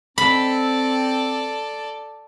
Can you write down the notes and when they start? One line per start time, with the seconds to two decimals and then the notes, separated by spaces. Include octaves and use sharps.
0.18 C4 A4 D5 B5